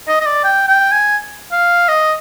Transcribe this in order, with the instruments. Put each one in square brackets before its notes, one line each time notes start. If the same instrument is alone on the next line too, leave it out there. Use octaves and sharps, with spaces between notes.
[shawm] D#5
D#5
D5
G5
G5
G#5
F5
D#5